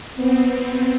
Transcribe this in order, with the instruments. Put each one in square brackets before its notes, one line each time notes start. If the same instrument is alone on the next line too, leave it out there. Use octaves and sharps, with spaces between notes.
[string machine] B3 C4